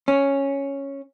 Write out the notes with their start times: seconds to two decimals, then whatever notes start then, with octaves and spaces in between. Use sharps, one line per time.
0.08 C#4